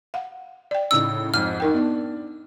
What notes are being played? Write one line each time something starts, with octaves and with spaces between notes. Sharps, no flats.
F5 F#5
D5 G5
A2 C#3 D#4 E6
F2 G#2 F6
D#4 A#4 G5
B3 D4 D#4